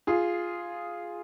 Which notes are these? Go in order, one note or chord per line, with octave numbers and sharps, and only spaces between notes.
F4 G#4